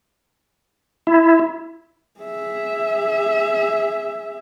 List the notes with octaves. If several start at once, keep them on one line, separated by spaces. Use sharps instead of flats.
E4
G#4 E5